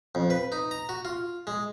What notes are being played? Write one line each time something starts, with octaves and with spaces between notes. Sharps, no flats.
F2
B4
D#4
A#5
F#4
F4
G#3